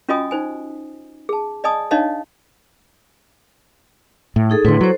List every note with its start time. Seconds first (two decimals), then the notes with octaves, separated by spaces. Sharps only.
0.09 C#4 F4 F#4 D#5 G#5 D#6
0.31 D#4 C5 G#5
1.29 G#4 A5
1.64 D5 D#5 G#5 A5 D#6
1.91 D4 D#4 C#5 D#5 F5 A5
4.36 A2
4.50 D#4 G#4 A4
4.65 A2 D3 E4 B4 C6
4.81 F#3 A4 C5